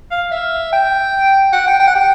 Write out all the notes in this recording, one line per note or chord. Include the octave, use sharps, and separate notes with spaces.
F5
E5
G5
F#5
G5
G5
F#5
G5